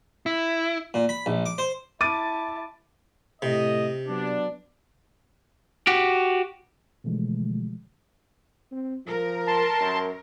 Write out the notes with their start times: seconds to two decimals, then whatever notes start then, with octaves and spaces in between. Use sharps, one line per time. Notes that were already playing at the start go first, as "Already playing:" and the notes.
0.26 E4
0.94 A#2
1.09 B5
1.26 A#1
1.46 D6
1.58 C5
2.01 E4 A5 D6 A6 D#7
3.42 A2 C3 A3 D#5
4.08 F#3 B3 D4
5.87 F#4 G4
7.04 B2 D3 E3 F3 G#3 A3
8.72 C4
9.07 F3 A#4
9.47 A5 C6
9.81 F#2